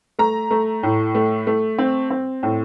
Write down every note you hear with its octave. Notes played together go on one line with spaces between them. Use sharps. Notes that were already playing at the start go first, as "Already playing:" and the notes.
A3 A#5
A3
A2
A3
A3
C4
C4
A2